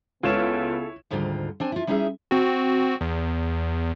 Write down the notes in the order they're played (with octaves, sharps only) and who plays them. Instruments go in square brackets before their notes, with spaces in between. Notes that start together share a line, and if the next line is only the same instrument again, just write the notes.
[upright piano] C#2 F4 [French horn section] C#3 B3 [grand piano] E4 C#5 E7 [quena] A4
[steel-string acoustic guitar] D2 G#2 D3 D#3 G3 F4
C4 D4 G#5
E4 F4
G3 C#4 D#4 E4 G#4 E5
[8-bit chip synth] C4 F#4
E2